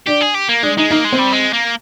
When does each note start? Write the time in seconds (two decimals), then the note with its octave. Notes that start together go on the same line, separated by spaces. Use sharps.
0.06 D4 G4
0.21 G#4
0.34 G4
0.49 A#3
0.63 G#3 D4
0.77 G#3 D#4
0.91 A#3 D#4
1.04 G#3
1.12 C4
1.18 G3
1.32 G#3
1.53 A#3